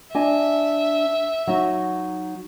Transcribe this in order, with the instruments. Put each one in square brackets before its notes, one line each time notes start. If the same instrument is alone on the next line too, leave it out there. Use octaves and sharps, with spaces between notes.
[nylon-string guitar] D4 D#5 G#5 [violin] E5
[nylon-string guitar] F#3 D#4 F#4